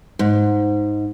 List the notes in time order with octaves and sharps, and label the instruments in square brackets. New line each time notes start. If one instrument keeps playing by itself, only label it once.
[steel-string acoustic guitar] G#2